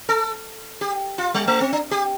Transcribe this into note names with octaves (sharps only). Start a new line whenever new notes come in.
A4
G4
F4
G3
A3
C4
D4
G4